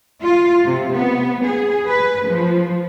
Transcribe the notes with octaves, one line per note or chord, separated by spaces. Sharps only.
F4
C3
B3
G#4
B4
F3